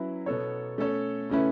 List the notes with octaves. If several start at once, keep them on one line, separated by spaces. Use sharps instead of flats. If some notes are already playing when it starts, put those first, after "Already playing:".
Already playing: F#3 C#4 E4 B4
B2 B3 A4 C#5
A3 C#4 A4 C#5
C#3 A3 C#4 E4 B4